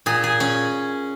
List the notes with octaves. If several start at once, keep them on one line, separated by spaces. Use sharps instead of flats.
A#2 G#4
G#4
C#4